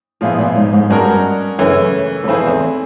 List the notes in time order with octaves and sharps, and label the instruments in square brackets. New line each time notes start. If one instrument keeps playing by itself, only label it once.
[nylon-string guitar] A#2 [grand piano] F3 G#3 B3 E4
[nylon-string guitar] A#2
G#2
G#2
[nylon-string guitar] G2 [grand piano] G#3 C#4 F#4 A#4
[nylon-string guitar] F#2 [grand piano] C#3 E3 A3
[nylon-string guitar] E2
[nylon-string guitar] F2 [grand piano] A3 C4 E4 G#4 B4
[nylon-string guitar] E2